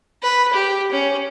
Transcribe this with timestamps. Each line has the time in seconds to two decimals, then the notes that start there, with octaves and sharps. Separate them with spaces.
0.23 B4
0.53 G4
0.92 C#4